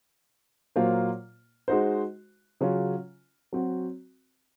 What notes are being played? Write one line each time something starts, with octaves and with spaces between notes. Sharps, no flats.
A#2 F#3 A#3 F4 C5
G#3 D#4 F#4 C5
C#3 F#3 C#4 F4
F#3 C4 F#4